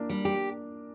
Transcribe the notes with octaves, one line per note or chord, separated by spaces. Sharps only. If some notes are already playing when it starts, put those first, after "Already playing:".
Already playing: A#3 D4
G3
G4